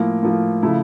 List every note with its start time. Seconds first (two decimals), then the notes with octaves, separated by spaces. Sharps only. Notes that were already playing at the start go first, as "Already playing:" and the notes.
Already playing: A2 F3 A#3
0.22 A2 F3 A#3
0.62 C#3 F3 A3 E4